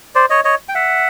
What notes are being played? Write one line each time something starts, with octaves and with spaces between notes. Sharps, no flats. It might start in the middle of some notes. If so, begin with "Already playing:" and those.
C5 D5
C#5 D#5
C#5 D#5
G5
E5 F#5